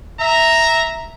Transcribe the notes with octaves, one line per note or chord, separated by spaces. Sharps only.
E5 A#5